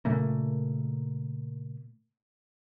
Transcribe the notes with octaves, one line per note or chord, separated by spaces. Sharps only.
A#2 C#3 A3 A#3